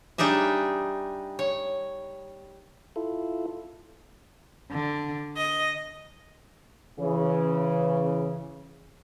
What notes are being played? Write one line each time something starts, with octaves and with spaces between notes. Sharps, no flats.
G3 D4 D#4 G#4 E5
C#5
E4 F4 A4
D3
D#5
C#3 E3